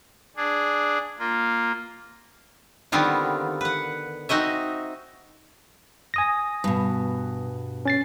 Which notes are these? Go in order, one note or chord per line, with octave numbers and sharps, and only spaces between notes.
D4 G#4
A#3 F4
D3 D#3 G3 B3 C4 F4
B4 F#5
C4 D#4 F#4 D#5 E5
G#5 D#6 A#6
G2 B2
C#4 A6 C7